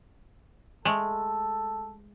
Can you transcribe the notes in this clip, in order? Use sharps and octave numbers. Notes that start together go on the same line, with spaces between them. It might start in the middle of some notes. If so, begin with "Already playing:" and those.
G#3 A3 A4